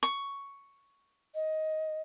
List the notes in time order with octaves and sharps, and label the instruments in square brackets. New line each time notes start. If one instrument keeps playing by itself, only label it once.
[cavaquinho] C#6
[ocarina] D#5